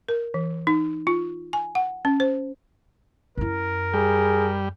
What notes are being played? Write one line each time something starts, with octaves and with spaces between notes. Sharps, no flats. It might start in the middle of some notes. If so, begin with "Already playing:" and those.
A#4
E3
D#4
F4
G#5
F#5
C#4
C5
F#2 E4 A#4
G3 G#4